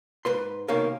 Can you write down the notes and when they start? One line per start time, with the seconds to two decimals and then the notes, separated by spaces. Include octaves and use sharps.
0.25 G#2 B4 C6
0.68 C2 B2 D#3 A#3 C#4 F5